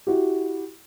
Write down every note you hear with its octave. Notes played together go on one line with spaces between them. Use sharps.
E4 F#4 G4